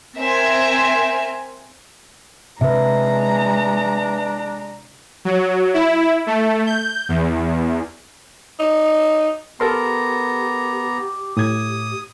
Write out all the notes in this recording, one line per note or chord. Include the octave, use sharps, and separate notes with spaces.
C4 A#4 C5 E5 G#5
C3 G#3 D4 B4 E5 A#5
F#3
E4
A3
G6
E2
D#4
B3 G4 A4 A#4 A#5 C6
A2 D#6 G#6